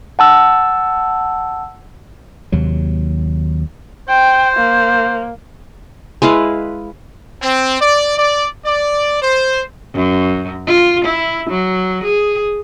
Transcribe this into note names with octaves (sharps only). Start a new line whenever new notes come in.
F#5 A5 E6
D#2 C3 F#3
C5 G5
A#3
G#3 E4 B4 F5
C4
D5
D5
D5
C5
F#2
F4
E4
F#3
G#4